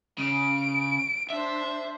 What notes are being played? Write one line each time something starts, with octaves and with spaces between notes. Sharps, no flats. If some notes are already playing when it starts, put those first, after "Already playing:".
C#3 D7
D4 C5 E5